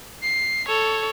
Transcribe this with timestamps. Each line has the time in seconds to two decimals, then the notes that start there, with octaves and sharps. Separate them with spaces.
0.23 C7
0.68 A4 C#5